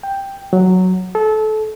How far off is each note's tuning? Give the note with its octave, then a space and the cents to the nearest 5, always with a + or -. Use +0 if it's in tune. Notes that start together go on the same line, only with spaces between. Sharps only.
G5 +5
F#3 +0
A4 -25